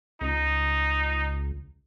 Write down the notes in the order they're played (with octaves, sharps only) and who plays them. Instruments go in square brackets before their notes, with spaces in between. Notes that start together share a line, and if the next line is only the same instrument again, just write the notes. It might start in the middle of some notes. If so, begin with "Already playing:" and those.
[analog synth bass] C#2 [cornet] D#4